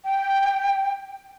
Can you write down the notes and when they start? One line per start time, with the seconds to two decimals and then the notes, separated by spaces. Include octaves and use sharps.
0.03 G5